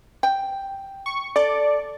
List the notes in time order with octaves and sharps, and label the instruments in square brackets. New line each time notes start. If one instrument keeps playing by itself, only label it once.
[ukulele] G5
[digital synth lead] C#6
[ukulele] A4 [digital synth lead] D5